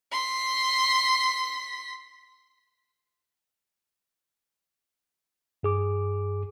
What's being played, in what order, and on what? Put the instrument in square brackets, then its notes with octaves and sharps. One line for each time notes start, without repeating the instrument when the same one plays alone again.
[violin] C6 B6
[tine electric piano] G2 G#4 D6